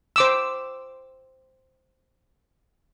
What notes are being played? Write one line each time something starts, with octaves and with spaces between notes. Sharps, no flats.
C5 D6 E6